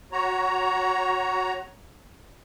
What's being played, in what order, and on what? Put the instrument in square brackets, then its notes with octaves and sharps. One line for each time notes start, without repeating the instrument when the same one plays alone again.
[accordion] F#4 C#5 A#5